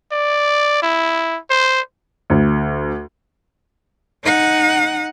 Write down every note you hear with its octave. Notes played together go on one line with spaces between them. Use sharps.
D5
E4
C5
D2
D#4 F#5